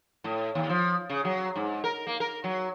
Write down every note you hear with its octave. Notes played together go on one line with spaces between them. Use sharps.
A2
D#2
F3
C#3
F#3
G#2
A#4
A#3
A#4
F#3